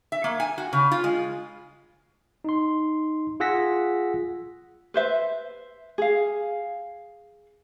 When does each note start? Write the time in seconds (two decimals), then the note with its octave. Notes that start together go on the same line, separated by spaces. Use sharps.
0.12 E5
0.24 A#3
0.40 G#5
0.58 F#4
0.73 C#3
0.91 F4
1.04 G#3
2.44 D#4 C6
3.40 F4 G#4 F#5 E6 A#6 B6
4.94 B4 C5 E5
5.98 G#4 F5